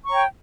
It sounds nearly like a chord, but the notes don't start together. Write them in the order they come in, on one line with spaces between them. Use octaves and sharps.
C#6 A#5 C#5 G5